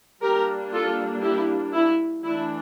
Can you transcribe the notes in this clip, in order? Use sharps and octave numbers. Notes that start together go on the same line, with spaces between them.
G3 A#3 D4 G4 A#4
F4 A4
E4 G4
E4
E3 A3 D4 E4